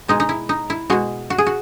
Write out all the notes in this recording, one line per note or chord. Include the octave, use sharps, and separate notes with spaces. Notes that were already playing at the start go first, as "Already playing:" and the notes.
B2 G#3 D#4
D#4
E4
D#4
E4
B2 G#3 F#4
F#4
G#4
F#4